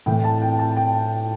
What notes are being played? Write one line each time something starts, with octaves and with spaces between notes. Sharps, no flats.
A2 E3 G5
A5
G5
A5
G5